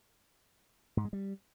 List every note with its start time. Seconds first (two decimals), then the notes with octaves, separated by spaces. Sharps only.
0.97 G#2
1.05 G#3
1.13 G3